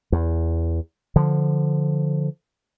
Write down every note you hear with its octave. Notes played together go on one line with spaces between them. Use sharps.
E2
D3 F3